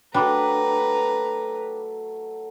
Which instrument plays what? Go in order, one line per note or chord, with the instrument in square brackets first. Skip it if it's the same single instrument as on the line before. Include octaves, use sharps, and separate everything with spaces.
[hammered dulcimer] F#3 A3 [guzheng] D4 [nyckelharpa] B4 A#5 [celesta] G5 B5 D6